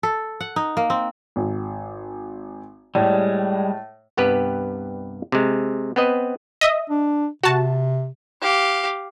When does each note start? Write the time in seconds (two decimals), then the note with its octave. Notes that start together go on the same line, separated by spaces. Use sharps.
0.03 A4
0.40 F#5
0.56 D#4
0.77 A#3
0.90 C4
1.36 G#1
2.95 A2 G3 G#3 D5
4.17 C2 G2 B3 G4 B4
5.32 C3 G#3
5.96 B3 C4 B4 D#5
6.61 D#5 E5 D#6
6.90 D4
7.43 C3 F#4 A5
8.41 G4 F5